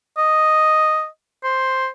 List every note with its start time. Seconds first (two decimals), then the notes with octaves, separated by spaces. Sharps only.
0.18 D#5
1.44 C5